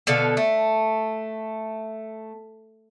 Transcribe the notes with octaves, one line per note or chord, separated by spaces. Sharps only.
B2 D3 A4 F5
A3